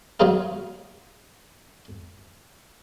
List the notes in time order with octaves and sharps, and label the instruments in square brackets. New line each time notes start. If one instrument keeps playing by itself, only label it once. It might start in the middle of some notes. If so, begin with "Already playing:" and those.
[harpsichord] F#3 G#3 F4 G#4 A#4 F5